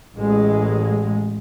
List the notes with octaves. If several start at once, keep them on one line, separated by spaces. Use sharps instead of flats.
A1 G#3